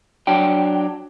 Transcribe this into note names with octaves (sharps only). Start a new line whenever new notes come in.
F#3 D4 G5